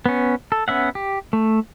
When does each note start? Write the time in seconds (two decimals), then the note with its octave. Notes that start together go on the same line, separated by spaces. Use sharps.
0.06 B3 C#4
0.52 A4
0.68 B3 C#4 E5 F#5
0.95 G4
1.33 A3